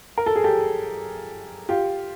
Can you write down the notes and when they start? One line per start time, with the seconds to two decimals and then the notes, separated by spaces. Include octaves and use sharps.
0.18 A#4
0.26 A4
0.36 G#4
0.44 G4 A4
1.69 F4 G4